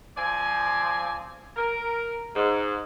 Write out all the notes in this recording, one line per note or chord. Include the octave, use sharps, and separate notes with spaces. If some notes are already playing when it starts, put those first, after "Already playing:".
F3 C4 D5 G#5
A#4
G#2